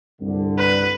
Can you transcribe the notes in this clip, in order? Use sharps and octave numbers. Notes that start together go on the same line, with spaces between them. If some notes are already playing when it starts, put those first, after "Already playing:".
C2 G2 D3
B4